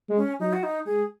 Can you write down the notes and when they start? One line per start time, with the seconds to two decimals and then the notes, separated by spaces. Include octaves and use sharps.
0.09 G#3
0.17 C#4
0.40 F#3 D#4
0.53 F#4
0.63 D#4
0.86 G#3 G#4